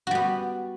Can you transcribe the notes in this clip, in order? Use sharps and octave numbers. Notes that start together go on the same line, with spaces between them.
G3 B3 F#4